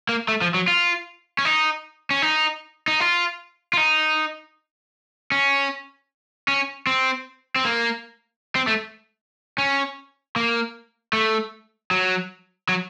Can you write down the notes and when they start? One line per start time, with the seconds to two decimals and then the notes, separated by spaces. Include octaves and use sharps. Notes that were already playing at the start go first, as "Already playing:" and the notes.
0.09 A#3
0.28 A3
0.41 F3
0.54 F#3
0.68 F4
1.39 C#4
1.45 D#4
2.10 C#4
2.22 D#4
2.88 D#4
3.00 F4
3.73 F4
3.77 D#4
5.32 C#4
6.48 C#4
6.87 C4
7.56 C4
7.65 A#3
8.56 C4
8.67 A3
9.58 C#4
10.36 A#3
11.13 A3
11.91 F#3
12.69 F#3